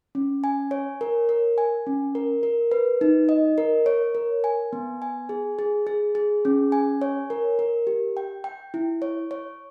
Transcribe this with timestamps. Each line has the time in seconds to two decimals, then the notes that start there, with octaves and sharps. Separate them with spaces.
0.15 C#4
0.44 G#5
0.71 C#5
1.01 A#4
1.29 A#4
1.58 G#5
1.87 C#4
2.15 A#4
2.43 A#4
2.72 B4
3.01 D#4
3.29 D#5
3.58 A#4
3.86 C#5
4.15 A#4
4.44 G#5
4.73 B3
5.02 G#5
5.29 G#4
5.59 G#4
5.87 G#4
6.15 G#4
6.45 C#4
6.72 G#5
7.02 C#5
7.30 A#4
7.59 A#4
7.87 G4
8.17 G5
8.44 G5
8.74 E4
9.02 C#5
9.31 C#5